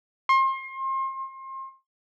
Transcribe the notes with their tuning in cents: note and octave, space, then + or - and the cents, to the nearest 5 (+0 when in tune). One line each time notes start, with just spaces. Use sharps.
C6 +30